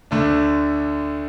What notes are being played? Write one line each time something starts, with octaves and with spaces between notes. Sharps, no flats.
D2 D3 A3 D4